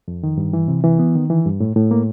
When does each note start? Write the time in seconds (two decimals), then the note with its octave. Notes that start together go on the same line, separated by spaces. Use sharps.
0.08 F2
0.23 D#3
0.38 G2
0.53 E3
0.68 C3
0.84 E3
0.99 B3
1.15 D#3
1.30 E3
1.46 G2
1.60 A2
1.76 A2
1.91 A#3